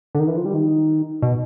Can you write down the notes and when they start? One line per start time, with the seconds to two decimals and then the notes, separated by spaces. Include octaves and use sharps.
0.15 D3
0.20 D#3
0.28 E3
0.37 F3
0.45 G3
0.54 D#3
1.22 B2